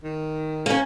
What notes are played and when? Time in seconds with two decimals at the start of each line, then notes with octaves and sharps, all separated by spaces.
0.03 D#3
0.66 A#3 C#4